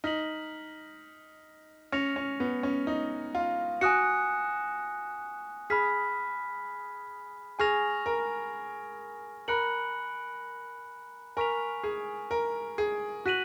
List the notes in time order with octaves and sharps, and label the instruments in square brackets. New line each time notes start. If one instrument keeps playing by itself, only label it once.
[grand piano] D#4 [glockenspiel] F6 B6 F#7
[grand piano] C#4 [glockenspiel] F6 A#6 C#7 F7
[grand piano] C#4
B3
C#4
D#4
F4
[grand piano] F#4 [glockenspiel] G#5 D#6 F#6 C#7
[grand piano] G#4 [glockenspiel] B5 F6 B6
[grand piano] G#4 [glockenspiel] G#5 C#6 F6 A#6 F7
[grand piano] A#4
[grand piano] A#4 [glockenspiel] B5 F#6 C#7 F#7
[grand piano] A#4 [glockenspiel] G#5 C#6 F6 B6 F7
[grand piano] G#4
A#4
G#4
[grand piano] F#4 [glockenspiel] F#6 B6 D#7 F#7